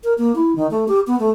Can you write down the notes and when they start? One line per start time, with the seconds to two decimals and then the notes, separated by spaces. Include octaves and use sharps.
0.04 A#4
0.18 A#3
0.35 E4
0.56 D#3
0.71 A3
0.88 G4
1.07 B3
1.19 A3